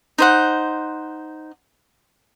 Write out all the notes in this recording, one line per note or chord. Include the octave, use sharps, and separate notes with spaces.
D#4 C5 F#5